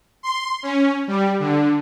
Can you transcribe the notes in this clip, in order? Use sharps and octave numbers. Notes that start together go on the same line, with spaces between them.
C6
C#4
G3
D3